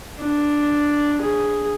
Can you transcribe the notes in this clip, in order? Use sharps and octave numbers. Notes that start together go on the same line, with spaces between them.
D4
G#4